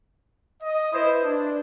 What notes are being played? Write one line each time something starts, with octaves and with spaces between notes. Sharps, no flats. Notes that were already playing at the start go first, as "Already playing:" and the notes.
D#5
E4 B4 C5 D#5 D#6
D4